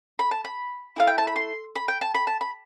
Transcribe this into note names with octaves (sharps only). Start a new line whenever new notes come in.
B5
A5
B5
A3 C4 E4 F5
G5
A5
B5
C6
B5
G5
A5
B5
A5
B5